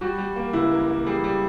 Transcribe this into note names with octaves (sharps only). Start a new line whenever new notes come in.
G3 F#4
G3
A#3
C#2 E4
A#3
A#3
G3 G#4
G3